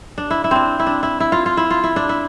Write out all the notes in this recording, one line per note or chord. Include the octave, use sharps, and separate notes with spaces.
D4
E4
E4
C4 D4
E4
D4
E4
E4
F4
F4
E4
F4
E4
D4
E4